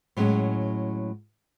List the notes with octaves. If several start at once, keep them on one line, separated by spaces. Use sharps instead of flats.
A2 F#3 G#3 C#4